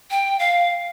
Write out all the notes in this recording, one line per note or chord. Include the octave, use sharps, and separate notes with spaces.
G5
F5